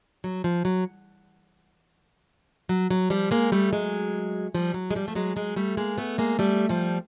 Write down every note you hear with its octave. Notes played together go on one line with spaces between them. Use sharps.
F#3
F3
F#3
F#3
F#3
F3 G3
G#3 A#3
G3 A3
F#3 G#3
F3 G3
F#3
G#3
F3 G3
A3
F#3 G#3
F#3 G#3
G3 A3
G#3 A#3
A3 B3
G#3 A#3
G3 A3
F3 G3